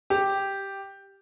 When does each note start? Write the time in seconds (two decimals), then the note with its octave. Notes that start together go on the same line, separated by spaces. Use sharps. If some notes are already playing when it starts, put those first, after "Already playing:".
0.10 G4